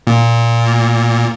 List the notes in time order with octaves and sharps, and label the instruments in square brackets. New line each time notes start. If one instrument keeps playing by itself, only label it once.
[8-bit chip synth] A#2